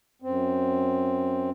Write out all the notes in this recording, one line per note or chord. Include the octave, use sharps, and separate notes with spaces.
F#2 C4